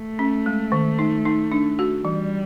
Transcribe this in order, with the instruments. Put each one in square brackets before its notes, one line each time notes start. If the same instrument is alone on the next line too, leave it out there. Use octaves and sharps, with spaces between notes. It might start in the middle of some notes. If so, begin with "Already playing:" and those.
Already playing: [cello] A3
[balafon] C#4
G#3
D#3
D#4
D#4
D4
F#4
[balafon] E3 [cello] G3